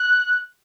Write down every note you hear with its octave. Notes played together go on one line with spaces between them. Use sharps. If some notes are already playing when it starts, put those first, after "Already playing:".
Already playing: F#6